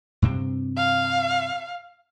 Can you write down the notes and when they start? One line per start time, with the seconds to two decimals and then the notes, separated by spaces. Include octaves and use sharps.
0.22 G2 C3 C4
0.77 F5